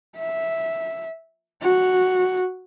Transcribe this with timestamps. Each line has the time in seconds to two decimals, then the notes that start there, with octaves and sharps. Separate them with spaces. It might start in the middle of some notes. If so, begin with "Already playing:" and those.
0.18 E5
1.62 F#4